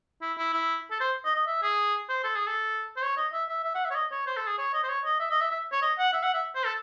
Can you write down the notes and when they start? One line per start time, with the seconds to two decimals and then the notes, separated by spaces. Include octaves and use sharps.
0.22 E4
0.38 E4
0.53 E4
0.91 A4
1.00 C5
1.25 D#5
1.35 D#5
1.47 E5
1.62 G#4
2.09 C5
2.24 A4
2.35 G#4
2.47 A4
2.97 C5
3.02 C#5
3.17 D#5
3.33 E5
3.49 E5
3.64 E5
3.75 F#5
3.85 E5
3.90 C#5
3.95 D#5
4.11 C#5
4.27 C5
4.37 A4
4.47 G#4
4.58 C#5
4.74 D#5
4.83 C5
4.89 C#5
5.05 D#5
5.20 E5
5.30 D#5
5.41 E5
5.51 E5
5.72 C#5
5.82 D#5
5.98 F#5
6.13 E5
6.23 F#5
6.34 E5
6.55 C5
6.65 A4